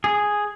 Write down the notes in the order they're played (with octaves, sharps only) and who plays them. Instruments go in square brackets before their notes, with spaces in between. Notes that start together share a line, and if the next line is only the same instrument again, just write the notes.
[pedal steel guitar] G#4